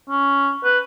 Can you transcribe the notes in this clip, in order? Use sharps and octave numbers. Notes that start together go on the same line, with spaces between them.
C#4
B4